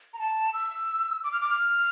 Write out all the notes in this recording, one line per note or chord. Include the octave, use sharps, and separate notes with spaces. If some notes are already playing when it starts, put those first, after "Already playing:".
A#5
A5
E6
D6
F6
D6
F6